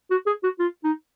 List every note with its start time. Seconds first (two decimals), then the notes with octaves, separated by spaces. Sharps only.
0.11 F#4
0.27 G#4
0.44 F#4
0.59 F4
0.84 D#4